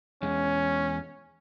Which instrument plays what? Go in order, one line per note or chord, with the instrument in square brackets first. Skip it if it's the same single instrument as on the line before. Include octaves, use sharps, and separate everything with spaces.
[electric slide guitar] E2 G#3 [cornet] C#4